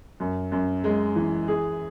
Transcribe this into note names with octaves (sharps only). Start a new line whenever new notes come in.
F#2
F#2
G#3
E3
G#4